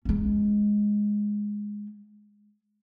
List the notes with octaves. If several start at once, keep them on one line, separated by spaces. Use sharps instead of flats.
G#3 C#4